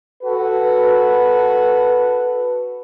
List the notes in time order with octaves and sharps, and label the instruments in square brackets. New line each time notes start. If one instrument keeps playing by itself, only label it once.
[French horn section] F#4 A4 B4